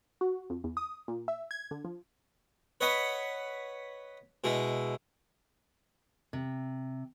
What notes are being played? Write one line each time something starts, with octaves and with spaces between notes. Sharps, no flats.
F#4
F2
E2
D#6
A#2
E5
G#6
D3
F3
B4 C#5 D#5 F#5 B5
B2 G#3 E4
C3